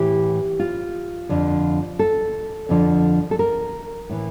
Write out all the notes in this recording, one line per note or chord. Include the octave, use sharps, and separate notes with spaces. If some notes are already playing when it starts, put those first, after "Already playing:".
Already playing: A2 E3 G4
F4
F2 D3 F3
A4
F2 D3 F3
A4
A#4
A2 E3